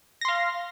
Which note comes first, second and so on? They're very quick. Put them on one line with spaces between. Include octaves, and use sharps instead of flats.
A#6 C6 F5